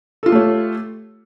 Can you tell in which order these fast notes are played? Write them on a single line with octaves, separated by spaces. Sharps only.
A4 F4 G4 A3 C#5